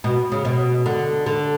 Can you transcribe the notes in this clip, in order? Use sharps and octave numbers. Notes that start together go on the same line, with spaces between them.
B2
C#3
B2
D3
D3